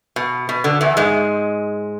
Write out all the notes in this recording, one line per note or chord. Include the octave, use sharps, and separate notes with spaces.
B2
B2
D3
E2 E3
G#2 G#3